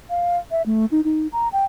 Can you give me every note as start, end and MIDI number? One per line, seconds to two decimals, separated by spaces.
0.10 0.37 77
0.51 0.62 76
0.66 0.86 57
0.91 1.01 63
1.04 1.27 63
1.32 1.48 82
1.53 1.65 79